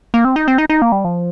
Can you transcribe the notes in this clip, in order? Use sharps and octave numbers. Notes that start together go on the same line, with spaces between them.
A#3
C4
D#4
C4
D#4
D#4
A#3
G3
F3